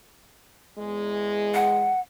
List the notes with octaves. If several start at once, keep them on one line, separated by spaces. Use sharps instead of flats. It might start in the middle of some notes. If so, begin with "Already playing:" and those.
E2 G#3
F#5